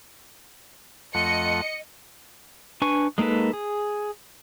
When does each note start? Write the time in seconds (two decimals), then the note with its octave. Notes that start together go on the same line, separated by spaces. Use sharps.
1.14 F2 A3 D#5 F#5 C#7
2.82 D4 B4 G#5 C#6
3.18 G#3 A#3 D#4 A4 B4
3.53 G#4